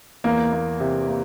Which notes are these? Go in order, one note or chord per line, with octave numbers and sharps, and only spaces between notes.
E2 A#3
A#3
C3
A#3